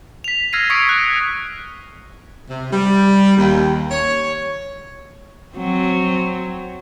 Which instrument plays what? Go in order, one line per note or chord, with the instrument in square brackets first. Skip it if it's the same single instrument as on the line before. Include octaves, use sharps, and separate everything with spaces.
[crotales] B6 F7
E6 F6 G#6 A#6 C7 D#7
C#6 D#6 G#6 B6 C#7 D7
F#6
[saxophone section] C3
G3
D#2
C#5
[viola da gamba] F#3 C4